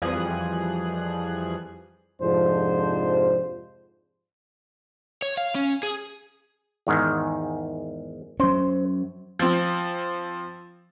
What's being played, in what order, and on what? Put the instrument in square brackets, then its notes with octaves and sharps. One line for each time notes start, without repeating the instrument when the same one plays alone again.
[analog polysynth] F2 E3 F3 G3 G#4 F#6
[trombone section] F2 G#2 C3 F3 D4 C5
[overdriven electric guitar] C#5
F5
C#4
G#4
[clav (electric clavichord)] E2 G#2 D#3
[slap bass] F#3 C#4 [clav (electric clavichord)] C5
[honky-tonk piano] F3 C4